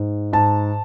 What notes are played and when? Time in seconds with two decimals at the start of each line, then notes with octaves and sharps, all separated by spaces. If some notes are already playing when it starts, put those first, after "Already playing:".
Already playing: G#2
0.33 G#2 A5